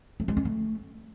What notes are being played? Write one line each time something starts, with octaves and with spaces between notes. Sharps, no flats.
A3
G#3
C#4
A3